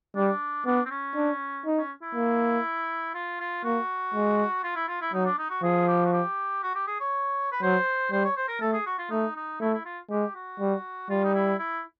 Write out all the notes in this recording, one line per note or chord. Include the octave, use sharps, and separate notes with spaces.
G3 D4
B3 D4
C4
C#4
D4
D#4
C#4
E4
A#3
F4
F4
A#3 F#4
G#3
F4
E4
F4
E4
F#3 D#4
D4
D#4
F#4
F3 G#4
G4
F#4
G4
F#4
G4
G#4
C#5
B4
F#3 C5
G3 C5
C#5
C5
A#4
A3 A4
G#4
F#4
F4
A3 D#4
D#4
A3 E4
E4
F4
G#3 G4
F#4
G3
G3 F4
D#4
E4
E4